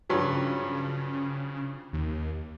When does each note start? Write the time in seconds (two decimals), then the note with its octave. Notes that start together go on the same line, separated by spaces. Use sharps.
0.10 G2 C#3 F3 F#3
1.93 D#2